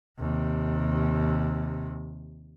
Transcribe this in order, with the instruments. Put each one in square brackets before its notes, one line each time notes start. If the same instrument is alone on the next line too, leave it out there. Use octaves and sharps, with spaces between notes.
[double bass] D#2 C3